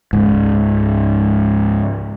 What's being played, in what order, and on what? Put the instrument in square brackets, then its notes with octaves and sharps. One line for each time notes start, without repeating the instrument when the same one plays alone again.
[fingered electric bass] C#2 G#2